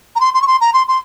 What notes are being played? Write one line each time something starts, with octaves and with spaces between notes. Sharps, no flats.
A#5
C6
C6
C#6
C6
A#5
C6
C6